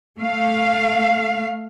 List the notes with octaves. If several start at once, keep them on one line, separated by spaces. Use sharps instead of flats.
A3 F5